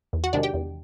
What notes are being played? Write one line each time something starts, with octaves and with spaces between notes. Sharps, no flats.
E2
F#4 F#5
C3 D#3 G#3 D4 D5
G4 G5
E2